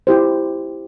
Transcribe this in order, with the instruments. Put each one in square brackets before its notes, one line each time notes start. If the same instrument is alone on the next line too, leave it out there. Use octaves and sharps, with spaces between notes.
[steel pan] E4 G4 C5